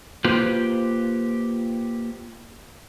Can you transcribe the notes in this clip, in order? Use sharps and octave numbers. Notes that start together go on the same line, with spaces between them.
A#3 F4 G4 B4 C5